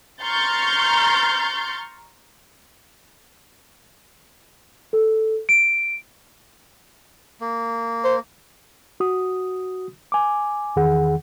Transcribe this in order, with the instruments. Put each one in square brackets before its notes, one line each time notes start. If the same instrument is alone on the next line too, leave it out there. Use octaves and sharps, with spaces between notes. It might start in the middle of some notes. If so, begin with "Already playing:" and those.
[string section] A#5 C6 C#6 F6 G6 A6
[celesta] A4
D7
[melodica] A#3
[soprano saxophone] C5
[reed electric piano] F#4 D#6
G#5 D6
E2 D#3 G#4 F#5